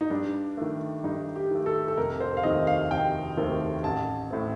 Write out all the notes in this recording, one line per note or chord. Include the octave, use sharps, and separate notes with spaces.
D#4
G2 D4
D#3 A3
G2 D#4
G4
D#3 A3
A4
A4
F1 A#4
C5
F5
D#2 D#3 A3 C4 D#5
F5
F1 G5
D#2 D#3 A3 C4
A1 A5
A2 A3 C4